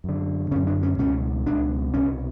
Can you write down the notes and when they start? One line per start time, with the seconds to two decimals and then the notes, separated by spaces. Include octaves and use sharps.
0.04 F#2 D3
0.51 D3 C#4
0.55 F#2
0.67 D4
0.83 C#4
0.98 C#2 B2 C#4
1.46 C#2 B2 D4
1.93 C2 B2 C#4